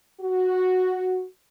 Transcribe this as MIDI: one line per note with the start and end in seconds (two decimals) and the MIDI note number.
0.21 1.24 66